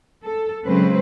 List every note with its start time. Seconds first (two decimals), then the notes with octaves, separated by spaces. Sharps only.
0.24 A4
0.65 C#3 F#3 G#3 C4 B4 C5